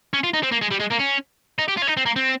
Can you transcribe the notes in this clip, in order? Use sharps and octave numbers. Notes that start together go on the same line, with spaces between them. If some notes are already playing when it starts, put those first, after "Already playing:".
C#4
F4
D#4
C4
A#3
G#3
G3
G#3
A#3
C#4
D#4
G4
F4
C#4
D#4
C4
A#3
C4